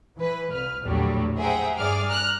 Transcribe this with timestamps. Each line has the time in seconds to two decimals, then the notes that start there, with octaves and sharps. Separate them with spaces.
0.16 E3 B4
0.51 C2 B4 F6
0.83 A#1 E2 A2 D3 F#3 G3
1.38 G#4 C5 E5 F#5 G5 A#5
1.78 G2 G#4 D5 D6 F6
2.08 A#5 F6 F#6